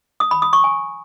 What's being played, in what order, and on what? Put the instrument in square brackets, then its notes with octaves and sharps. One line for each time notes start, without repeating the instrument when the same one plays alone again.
[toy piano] D#6
B5
D#6
C#6
G#5